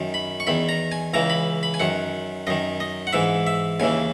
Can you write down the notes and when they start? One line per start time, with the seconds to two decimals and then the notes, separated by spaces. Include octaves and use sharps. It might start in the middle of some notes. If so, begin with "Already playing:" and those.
Already playing: F#2 D#3
0.14 B5
0.40 C#6
0.47 E2 D#3 B5
0.69 A#5
0.92 G#5
1.14 C#2 C#3 E3 A#5
1.30 B5
1.63 B5
1.74 G#5
1.80 F#2 D#3 F#5
2.47 F#2 D#3 D#5
2.80 D#5
3.07 F#5
3.13 G#2 E3 E5
3.47 E5
3.80 D#2 C#3 E3 G#5